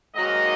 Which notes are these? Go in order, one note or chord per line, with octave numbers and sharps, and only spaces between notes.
G#2 D#3 F#3 A#3 D#5